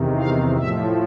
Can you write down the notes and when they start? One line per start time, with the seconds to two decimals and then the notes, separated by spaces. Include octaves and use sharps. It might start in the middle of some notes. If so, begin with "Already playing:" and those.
Already playing: E2 C3 D#3
0.18 F5
0.57 A2 F3 E5